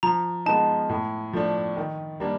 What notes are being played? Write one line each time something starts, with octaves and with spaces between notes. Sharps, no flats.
F3 A#5
G#3 B3 D#4 A5
A2
F3 A3 D4
D#3
G3 A#3 D4